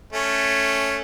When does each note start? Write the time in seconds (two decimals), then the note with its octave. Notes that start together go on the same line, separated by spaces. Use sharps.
0.13 A3 C#4